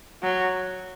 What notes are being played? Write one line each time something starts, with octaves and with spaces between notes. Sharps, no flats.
F#3